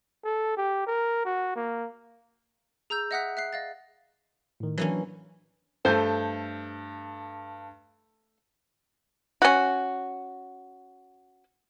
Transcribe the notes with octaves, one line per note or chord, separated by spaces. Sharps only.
A4
G4
A#4
F#4
A#3
G#4 A#5 E6 G6
D#5 E5 F#5 D#6 F#6 B6
E5 F#6 C7
D#5 F5 A6
A2 D#3
E3 F#3 A#3 C#4 D4
G2 A3 A4 C5 G6
C#4 F#4